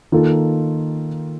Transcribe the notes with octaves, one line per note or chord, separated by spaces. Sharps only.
D#3 A#3 F4 A4